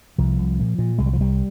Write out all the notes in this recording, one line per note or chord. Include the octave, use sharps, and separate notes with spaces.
C2 F3
C2
A#2
A#2
C2 G#3
G3
F3
C2 G3